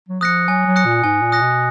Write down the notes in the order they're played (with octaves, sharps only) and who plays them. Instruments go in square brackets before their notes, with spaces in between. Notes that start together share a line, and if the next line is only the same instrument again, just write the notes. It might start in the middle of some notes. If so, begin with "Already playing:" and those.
[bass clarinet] F#3
[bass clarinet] F3 [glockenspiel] D#6 F#6 A#6 C#7
[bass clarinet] F#3 [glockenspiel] G#5
[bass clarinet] F#3
[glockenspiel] D#6 F#6 A#6 C#7
[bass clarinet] A#2
[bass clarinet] G#2 [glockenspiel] G#5
[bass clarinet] A#2
[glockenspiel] D#6 F#6 A#6 C#7
[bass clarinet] B2